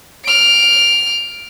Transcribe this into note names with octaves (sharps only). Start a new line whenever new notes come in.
F6 D7